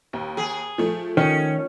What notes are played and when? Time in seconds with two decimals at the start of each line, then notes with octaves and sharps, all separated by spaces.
0.13 D#2
0.37 G#4
0.78 F3 A3
1.17 D#3 C#4